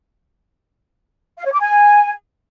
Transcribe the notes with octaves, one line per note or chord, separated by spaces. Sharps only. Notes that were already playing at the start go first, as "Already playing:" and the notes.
F5
C#5
D6
G#5